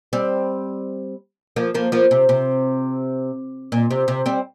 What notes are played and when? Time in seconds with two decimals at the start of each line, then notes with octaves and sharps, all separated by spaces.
0.13 G3 C4
1.56 F3 A#3
1.74 F3 A#3
1.92 F3 A#3
2.11 C3
2.29 C3
3.72 A#2
3.91 C3
4.08 C3
4.26 G3 C4